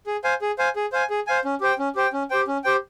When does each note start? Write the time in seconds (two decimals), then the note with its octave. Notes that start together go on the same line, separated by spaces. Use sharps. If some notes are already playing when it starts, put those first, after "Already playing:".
0.07 G#4
0.24 C5 F5 G#5
0.41 G#4
0.59 C5 F5 G#5
0.76 G#4
0.92 C5 F5 G#5
1.10 G#4
1.27 C5 F5 G#5
1.45 C#4
1.61 G4 C5 G5
1.79 C#4
1.95 G4 C5 G5
2.13 C#4
2.30 G4 C5 G5
2.47 C#4
2.64 G4 C5 G5